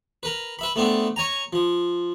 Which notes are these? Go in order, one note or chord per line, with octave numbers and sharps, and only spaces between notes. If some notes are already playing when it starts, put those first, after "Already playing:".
A#4 B4
B4 E5 B5
A3 B3 C4 D4
C#5 G#5 A#5
F3